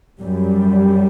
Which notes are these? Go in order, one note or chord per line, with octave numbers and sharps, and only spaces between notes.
F#2 G3